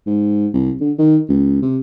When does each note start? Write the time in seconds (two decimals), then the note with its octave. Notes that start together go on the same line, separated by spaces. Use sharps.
0.07 G#2
0.54 C2
0.81 D3
0.99 D#3
1.29 C#2
1.62 C3